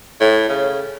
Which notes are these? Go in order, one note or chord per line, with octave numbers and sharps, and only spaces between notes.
A2
C#3